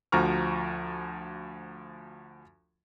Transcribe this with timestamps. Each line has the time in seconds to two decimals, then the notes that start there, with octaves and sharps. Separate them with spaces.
0.12 D2 F3 F#4 A#5 C#6 F6